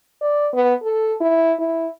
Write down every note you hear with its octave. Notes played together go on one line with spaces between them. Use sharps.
D5
B3
A4
E4
E4